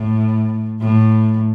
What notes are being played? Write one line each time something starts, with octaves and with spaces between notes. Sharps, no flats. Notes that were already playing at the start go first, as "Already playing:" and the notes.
Already playing: A2
A2